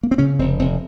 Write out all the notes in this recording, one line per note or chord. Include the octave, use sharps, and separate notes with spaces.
A#3
C4
C#3 C#4
F1 C4
F1 C4